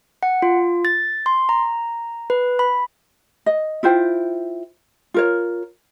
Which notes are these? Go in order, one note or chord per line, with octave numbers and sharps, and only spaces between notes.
F#5
F4
A6
C6
A#5
B4
B5
D#5
E4 F4 C5 G5
F4 A#4 C#5